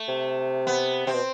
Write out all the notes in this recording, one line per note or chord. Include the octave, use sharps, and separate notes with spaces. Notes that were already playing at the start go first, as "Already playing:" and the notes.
Already playing: A3
C3
B3
C3 C4
B2